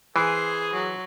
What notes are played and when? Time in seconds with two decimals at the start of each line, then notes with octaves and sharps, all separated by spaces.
0.16 E3 G#4 C5
0.73 F#3